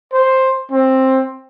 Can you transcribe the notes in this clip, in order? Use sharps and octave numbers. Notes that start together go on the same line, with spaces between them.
C5
C4